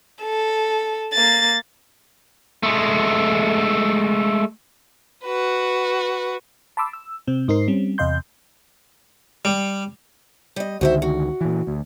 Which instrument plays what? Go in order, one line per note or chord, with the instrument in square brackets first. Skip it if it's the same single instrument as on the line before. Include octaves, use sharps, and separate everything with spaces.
[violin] A4
A#3 A6
[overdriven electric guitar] G#3 A3
[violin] F#4 B4
[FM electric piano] A5 B5 C6 D6 E6
E6
C3 C4
G#2 D#4 A#4 C5 C7
G3 C4 C#4
E2 C3 D#5 F5 C6 G6
[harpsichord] G3
[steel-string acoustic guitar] G3 D#5
[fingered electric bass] C#2 D3 D#3 [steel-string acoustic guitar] F#4 C5 E5
[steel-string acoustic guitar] F#4
[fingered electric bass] A#2 E3
D2